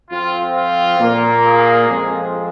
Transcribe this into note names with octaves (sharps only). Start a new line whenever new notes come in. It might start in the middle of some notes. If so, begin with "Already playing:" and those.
F2 F3 C4 F4
F4
A#2 A#3
G#4
F2 F3 G#3 C4